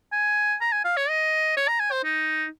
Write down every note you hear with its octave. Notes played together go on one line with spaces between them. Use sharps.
G#5
A#5
G#5
F5
C#5
D#5
C#5
A#5
G#5
C5
D#4